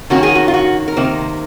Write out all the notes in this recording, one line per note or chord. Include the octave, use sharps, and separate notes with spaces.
D#3 A#3 C#4 F#4
G#4
F#4
F4
F#4
A#4
C3 D#3 A#3 C5